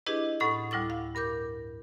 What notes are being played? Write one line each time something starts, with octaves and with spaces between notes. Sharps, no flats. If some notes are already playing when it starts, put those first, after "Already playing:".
D4 E4 G4 G#4 B4 D#5
A2 D#4 A4 F#5 B5 A6
D2 G3 E4 D6 A6
F5
G2 A#4 D6 G6